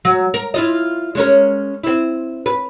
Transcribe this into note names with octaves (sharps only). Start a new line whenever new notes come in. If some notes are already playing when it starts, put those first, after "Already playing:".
F#3
A#4
E4 F4 D#5
G#3 C#4 A#4
C4 E4
B4